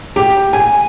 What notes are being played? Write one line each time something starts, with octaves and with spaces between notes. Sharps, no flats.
G4
G#5